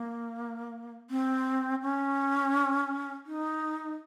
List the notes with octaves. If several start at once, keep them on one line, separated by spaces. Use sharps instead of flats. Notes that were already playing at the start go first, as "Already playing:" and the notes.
Already playing: A#3
C4
C#4
D#4